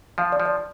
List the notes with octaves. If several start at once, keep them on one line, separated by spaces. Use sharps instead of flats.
F3 F5
D5
F3
D5